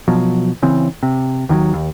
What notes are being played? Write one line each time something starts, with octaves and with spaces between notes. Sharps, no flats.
B2 F3 F#3
C#3 E3 C4
C3
D#2 D#3 E3 F#3
D#2